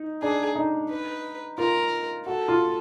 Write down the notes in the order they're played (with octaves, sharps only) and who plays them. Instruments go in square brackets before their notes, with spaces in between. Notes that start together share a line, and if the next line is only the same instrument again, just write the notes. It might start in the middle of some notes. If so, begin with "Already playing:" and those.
Already playing: [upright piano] D#4
[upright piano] D4 [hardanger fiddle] G#4
[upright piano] D#4
[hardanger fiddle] B4
[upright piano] F4 [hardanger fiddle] A#4
[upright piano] F#4 [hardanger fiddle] A4
[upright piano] F4